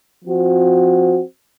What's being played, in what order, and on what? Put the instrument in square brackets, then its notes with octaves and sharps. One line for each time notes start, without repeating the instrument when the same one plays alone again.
[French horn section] F3 C4 F#4